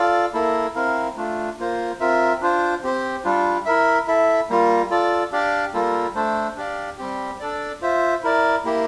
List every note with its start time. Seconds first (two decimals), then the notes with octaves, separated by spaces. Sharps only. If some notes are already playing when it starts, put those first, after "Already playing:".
Already playing: F4 A4 D5 F5
0.34 A#3 E4 A4
0.75 C4 E4 A#4 F5
1.16 A3 D4 F4
1.59 A#3 F4 C5
2.00 C4 F4 A#4 E5
2.41 D4 F4 C5
2.83 C4 G4 C5
3.25 G3 D4 F4
3.65 E4 A#4 E5
4.07 E4 A4 E5
4.49 G3 A#3 F4
4.90 F4 A4 D5
5.32 D4 G4 D5 F5
5.74 G3 A#3 F4 A4
6.15 A3 D4 A4 C5
6.56 D4 G4 D5 F5
6.98 G3 C4 G4
7.40 D4 A4 D5
7.82 F4 C5 E5
8.23 E4 A#4 D5
8.65 A#3 E4 G4